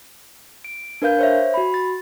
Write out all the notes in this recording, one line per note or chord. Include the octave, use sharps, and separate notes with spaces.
D7
D4 A#4 B4 F5 G6
C5 C#5 E5
F#4 B5
A6